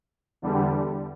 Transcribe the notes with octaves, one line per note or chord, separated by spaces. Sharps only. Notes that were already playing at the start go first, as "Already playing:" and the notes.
E2 D3 G3